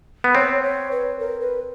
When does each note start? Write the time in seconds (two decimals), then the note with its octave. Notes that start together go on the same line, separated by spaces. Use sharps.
0.24 B3
0.34 C4 C#5
0.62 C#5
0.91 B4
1.19 A#4
1.40 B4